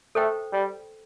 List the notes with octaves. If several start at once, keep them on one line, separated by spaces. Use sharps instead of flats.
A3 A4 C5 G5
G3